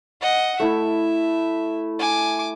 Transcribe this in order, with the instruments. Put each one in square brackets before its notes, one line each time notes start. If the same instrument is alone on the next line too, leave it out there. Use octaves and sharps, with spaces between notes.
[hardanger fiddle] D#5 F#5
[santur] A3 E4 [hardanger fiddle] E5
[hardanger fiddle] G#5 D6